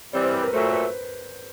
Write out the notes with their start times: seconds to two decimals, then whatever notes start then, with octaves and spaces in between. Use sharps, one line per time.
0.13 E3 G3 C4 C#5
0.24 C5
0.33 B4
0.43 A#4
0.48 B4
0.53 A#2 F#3 A3 C5
0.63 C5
0.72 B4